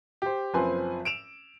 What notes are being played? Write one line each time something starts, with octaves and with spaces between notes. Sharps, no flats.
G4 C5
F#1 F3 C4 B4 G#5 C6
D7 E7 F7